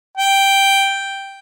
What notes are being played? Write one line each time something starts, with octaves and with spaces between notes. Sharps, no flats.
G5